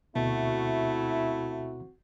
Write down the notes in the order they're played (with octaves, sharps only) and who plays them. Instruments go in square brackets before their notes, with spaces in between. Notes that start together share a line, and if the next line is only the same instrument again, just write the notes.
[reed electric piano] D2 B2 [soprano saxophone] A3 [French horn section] C4 F#4 [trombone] E4